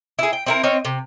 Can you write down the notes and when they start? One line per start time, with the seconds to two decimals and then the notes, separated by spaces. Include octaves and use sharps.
0.19 E4 G#4
0.33 G5
0.46 C4 E4 A#4
0.63 C4 D#4 C#5 F5
0.85 C3